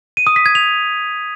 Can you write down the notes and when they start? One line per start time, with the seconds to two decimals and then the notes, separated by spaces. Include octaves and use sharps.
0.17 D#7
0.27 D#6
0.36 B6
0.46 G#6
0.55 F7